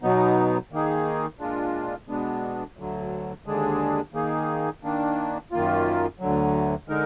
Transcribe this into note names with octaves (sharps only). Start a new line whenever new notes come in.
B2 F#3 B3 D#4
D#3 A#3 D#4 G#4
A#2 G#3 D4 F4
B2 G#3 B3 D4
D2 D3 F#3
D#2 D3 G#3 D4 G#4
D#3 A#3 D#4 G#4
D#3 A#3 D4
F#2 D#3 A#3 F4
D2 D3 F#3
D3 G#3 D#4 A#4